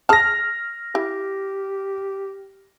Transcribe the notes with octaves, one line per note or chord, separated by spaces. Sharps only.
G#4 A5 F6 A#6
E4 G4